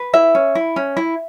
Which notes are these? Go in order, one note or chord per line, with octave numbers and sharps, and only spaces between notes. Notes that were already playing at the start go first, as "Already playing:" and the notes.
Already playing: B4
E4 E5
C#4
E4
C#4
E4